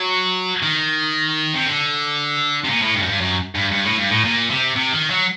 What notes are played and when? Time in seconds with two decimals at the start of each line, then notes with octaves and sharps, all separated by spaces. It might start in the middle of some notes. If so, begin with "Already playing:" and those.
Already playing: F#3
0.63 D#3
1.54 C3
1.66 D3
2.64 C3
2.69 A#2
2.82 A2
2.95 G2
3.02 F#2
3.08 G2
3.21 F#2
3.55 G2
3.72 G2
3.85 A2
3.98 G2
4.11 A2
4.24 A#2
4.50 C3
4.76 C3
4.93 D#3
5.10 F#3